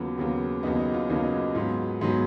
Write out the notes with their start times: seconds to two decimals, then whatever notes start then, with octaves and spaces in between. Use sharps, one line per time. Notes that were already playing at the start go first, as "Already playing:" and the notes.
Already playing: D#2 C#3 F#3 B3 F4
0.18 D#2 C#3 F#3 B3
0.63 D#2 C#3 F#3 B3 D#4
0.79 D#4
0.94 F4
1.10 D#2 C#3 F#3 B3 D#4
1.17 F4
1.24 D#4
1.55 G#2 F#3 B3 F4
2.01 G#2 F#3 B3